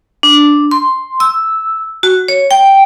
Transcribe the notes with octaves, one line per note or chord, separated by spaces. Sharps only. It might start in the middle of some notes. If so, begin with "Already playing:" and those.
D4
C6
E6
F#4
C#5
G5